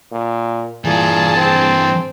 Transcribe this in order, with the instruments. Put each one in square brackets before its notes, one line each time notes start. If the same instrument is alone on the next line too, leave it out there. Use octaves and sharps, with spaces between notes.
[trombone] A#2
[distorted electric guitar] G2 E3 [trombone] A#2 [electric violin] G#4 A5
[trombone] C4